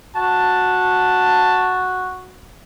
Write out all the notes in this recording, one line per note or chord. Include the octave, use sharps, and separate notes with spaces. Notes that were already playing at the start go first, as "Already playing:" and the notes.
F#4 A5